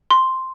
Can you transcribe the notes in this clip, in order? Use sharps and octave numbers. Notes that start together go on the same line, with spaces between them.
C6